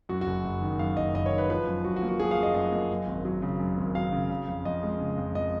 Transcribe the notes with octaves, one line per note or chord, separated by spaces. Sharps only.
F#2 F#4
F#4
F#1
F#1
D#3
F#2 F5
F#1 D#5
F#1 D#5
C#5
D#3
B4
F3 B4
F#2
F#2 F#4
F#4
A#3
F#4
F3 G#4
F5
F#2
D#5
F#2 D#5
A#3
F#2
G#1
F#3
C#3
F#2
G#1
F#3 F5
C#3
C#3
F2
F2 D#5
G#3
C#3
F2
F2 D#5